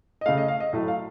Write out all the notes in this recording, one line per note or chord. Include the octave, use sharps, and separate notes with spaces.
D#5
C#3 A3 F5
D#5
F5
D#5
A2 F#3 A3
F5